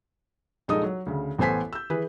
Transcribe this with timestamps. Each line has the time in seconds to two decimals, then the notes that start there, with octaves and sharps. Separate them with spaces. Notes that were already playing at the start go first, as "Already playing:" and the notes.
0.68 A#1 G#3 D#4 A4 D#6
0.83 F#3
1.06 D2 C#3
1.38 A1 B3 A4 C5 G#5 B6
1.73 E6 G6
1.90 E3 G#4 B4